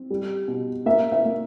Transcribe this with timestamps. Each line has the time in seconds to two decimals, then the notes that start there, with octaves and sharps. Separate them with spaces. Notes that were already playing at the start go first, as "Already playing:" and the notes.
Already playing: C4
0.10 G3
0.48 B2
0.86 A#3 E5
1.12 E5
1.25 A#3